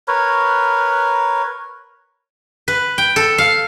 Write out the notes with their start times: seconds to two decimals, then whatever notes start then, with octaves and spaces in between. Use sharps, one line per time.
0.08 A#4 B4 C#5
2.68 B4
2.98 G5
3.16 A4
3.38 F5